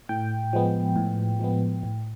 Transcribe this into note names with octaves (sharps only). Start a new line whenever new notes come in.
A2 G5
F3 G#3 B3
A2
F3 G#3 B3
A2